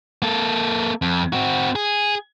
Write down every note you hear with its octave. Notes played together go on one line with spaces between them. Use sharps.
A#3 A4
F2
C4 F#4
G#4